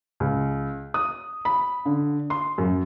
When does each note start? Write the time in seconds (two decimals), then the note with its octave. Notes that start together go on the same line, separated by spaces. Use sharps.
0.20 C#2
0.94 D#6
1.45 B5
1.85 D3
2.30 C6
2.58 F#2